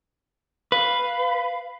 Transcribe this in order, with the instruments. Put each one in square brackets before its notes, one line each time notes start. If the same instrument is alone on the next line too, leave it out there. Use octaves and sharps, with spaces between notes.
[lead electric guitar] B4 [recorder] F5